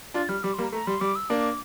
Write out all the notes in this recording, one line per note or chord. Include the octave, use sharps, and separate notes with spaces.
D4 F4 A6
G3 F6
G3 D6
G3 A#3 C6
A#5
A3 A#5
G3 C6
G3 D6
E6
A#3 D4 D6